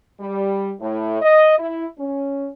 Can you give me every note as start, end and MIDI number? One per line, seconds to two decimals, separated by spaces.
0.20 0.72 55
0.81 1.21 45
1.21 1.57 75
1.58 1.85 64
1.97 2.48 61